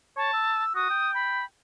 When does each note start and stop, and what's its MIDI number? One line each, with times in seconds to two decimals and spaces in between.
0.17 0.29 73
0.17 0.64 81
0.34 0.71 88
0.75 0.89 66
0.75 1.12 87
0.90 1.42 79
1.14 1.44 83